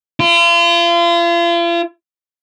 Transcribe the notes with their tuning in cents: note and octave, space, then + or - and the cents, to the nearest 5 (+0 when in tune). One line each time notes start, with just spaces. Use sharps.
F4 -40